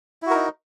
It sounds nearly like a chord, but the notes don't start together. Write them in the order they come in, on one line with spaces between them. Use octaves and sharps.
E4 F#4 A#4 D#4